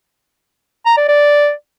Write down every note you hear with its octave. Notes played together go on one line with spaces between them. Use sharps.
A#5
D5
D5